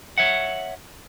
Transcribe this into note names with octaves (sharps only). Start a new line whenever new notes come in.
C#5 E5 F#5